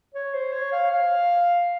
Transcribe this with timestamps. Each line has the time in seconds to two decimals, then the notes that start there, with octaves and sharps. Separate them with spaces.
0.15 C#5
0.34 C5
0.52 C#5
0.72 F5
0.91 F5